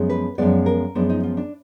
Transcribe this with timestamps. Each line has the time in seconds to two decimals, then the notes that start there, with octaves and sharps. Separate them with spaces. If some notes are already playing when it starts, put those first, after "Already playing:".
Already playing: F#2 F3 G#3 B3
0.10 B4
0.38 F#2 F3 G#3 B3 D5
0.66 A#4
0.95 F#2 F3 G#3 B3 D4
1.10 D#4
1.23 F4
1.37 D4